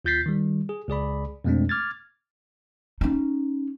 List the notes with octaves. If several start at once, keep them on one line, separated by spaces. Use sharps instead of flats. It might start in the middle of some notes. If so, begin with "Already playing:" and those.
D#2 F4 G6 A6 B6 C7
D#3 G3
G#4
C#2 G#4 D5 B5
F2 B2 G#3 A3 C4 D4
D6 F6 G#6 A6
C#4 D#4